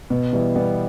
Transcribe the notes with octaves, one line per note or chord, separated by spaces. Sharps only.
B2
E3 G3
G3 B3